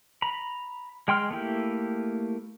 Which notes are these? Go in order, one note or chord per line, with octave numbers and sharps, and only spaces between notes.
A#5 B5
G#3 G5 C6 F6
A3 A#3 E4 G4